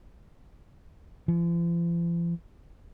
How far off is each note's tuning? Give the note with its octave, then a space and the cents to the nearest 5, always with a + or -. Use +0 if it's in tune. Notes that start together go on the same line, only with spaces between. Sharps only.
F3 -45